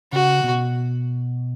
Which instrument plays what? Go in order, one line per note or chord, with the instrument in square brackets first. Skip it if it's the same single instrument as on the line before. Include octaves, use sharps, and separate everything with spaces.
[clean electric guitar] C#3 [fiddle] F#4
[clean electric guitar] B2